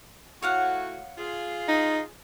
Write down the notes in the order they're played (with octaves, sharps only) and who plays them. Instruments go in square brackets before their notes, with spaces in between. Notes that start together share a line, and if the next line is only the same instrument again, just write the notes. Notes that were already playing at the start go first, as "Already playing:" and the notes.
[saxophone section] A2 F#4 [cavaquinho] C#5 F5 F#5
[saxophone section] F4 G#4
[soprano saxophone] D#4